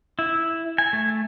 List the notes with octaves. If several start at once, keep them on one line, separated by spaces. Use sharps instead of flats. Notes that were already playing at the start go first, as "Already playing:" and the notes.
E4
G#5
A3